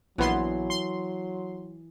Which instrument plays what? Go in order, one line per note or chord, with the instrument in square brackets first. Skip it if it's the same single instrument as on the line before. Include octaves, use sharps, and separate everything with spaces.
[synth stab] A#1 B3 C6 [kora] E3 [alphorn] F#3
[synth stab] C6